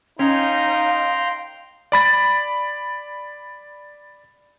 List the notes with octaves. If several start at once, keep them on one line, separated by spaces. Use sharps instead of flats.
C#4 D#4 F5 G5 A#5 C6
D5 B5 A6